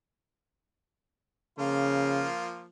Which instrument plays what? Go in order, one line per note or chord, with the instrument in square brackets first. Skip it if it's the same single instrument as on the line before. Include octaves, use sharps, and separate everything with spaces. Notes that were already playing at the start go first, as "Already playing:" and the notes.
[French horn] C#3 [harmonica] F3 A#3 F4